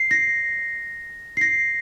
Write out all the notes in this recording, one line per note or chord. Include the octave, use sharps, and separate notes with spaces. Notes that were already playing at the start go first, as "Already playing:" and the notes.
Already playing: C7
A#6
C7
A#6